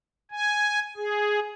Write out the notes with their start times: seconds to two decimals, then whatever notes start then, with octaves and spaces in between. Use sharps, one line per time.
0.31 G#5
0.97 G#4